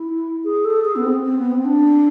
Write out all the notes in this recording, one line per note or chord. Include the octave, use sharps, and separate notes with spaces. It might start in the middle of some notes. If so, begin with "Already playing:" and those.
Already playing: E4
G#4
A4
G#4
B3
C4
C4
B3
C4
D4